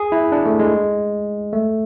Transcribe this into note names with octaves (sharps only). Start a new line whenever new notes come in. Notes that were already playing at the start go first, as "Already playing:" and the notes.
Already playing: G#4
E4
D4
A3
G#3
A3